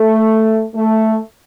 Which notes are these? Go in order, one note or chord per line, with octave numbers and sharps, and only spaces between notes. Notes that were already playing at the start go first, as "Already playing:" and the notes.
Already playing: A3
A3